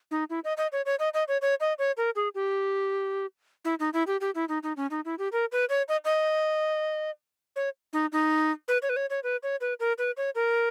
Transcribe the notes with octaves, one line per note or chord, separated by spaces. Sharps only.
D#4
E4
D#5
D#5
C#5
C#5
D#5
D#5
C#5
C#5
D#5
C#5
A#4
G#4
G4
E4
D#4
E4
G4
G4
E4
D#4
D#4
C#4
D#4
E4
G4
A#4
B4
C#5
D#5
D#5
C#5
D#4
D#4
B4
C#5
B4
C#5
C#5
B4
C#5
B4
A#4
B4
C#5
A#4